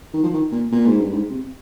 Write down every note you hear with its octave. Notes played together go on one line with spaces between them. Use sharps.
D#3
F3
D#3
A#2
A#2
G#2
G2
G#2
C3